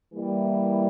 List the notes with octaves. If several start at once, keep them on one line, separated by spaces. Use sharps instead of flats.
E3 G3 A#3 E4